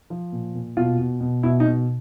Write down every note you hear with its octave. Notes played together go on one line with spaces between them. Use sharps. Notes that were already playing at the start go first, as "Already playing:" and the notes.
F3
A#2
A#2
B2 F4
B2
B2
B2 E4
D#4
B2